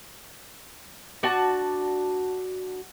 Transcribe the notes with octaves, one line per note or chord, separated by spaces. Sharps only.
D4 F#4 A5